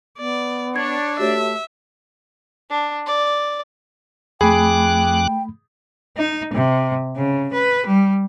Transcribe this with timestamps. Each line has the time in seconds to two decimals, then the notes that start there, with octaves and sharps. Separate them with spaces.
0.18 B3 D5
0.76 D4 C#5 G#6
1.19 A3 F#4 G4 C#5 E5
2.69 D4
3.06 D5
4.41 F2 A3 G#4 G5 B5 D6 F#6
6.18 D#4
6.54 C3
7.16 C#3
7.53 B4
7.86 G3